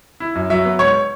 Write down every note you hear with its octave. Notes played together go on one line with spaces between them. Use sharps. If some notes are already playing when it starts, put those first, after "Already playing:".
E4
F#2
F#3 E5
B3
G#2 C#5